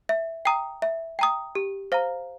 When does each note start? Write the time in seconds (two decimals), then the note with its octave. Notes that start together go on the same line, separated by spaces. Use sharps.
0.09 E5
0.45 G5 A#5 D#6
0.82 E5
1.19 G5 A#5 D#6
1.55 G4
1.92 C5 F5 A#5